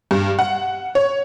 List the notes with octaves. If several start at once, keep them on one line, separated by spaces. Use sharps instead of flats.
G2
F#5
C#5